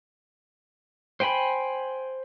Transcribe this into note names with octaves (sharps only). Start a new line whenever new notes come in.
C5 G5 G#5 B5